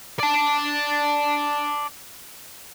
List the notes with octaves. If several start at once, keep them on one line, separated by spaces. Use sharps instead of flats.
D5 A5